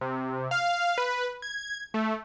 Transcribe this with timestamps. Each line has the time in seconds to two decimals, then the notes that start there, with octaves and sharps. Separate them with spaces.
0.01 C3
0.51 F5
0.98 B4
1.42 G#6
1.94 A3